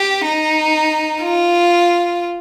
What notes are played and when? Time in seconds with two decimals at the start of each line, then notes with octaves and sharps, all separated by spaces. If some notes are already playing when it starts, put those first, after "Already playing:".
Already playing: G4
0.24 D#4
1.22 F4